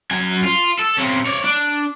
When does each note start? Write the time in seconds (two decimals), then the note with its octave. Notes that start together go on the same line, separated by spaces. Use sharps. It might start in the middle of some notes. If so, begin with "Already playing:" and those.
0.11 F#2 G#5
0.45 F4
0.80 A4
0.98 C3 C#4
1.27 C#5 D5
1.44 D4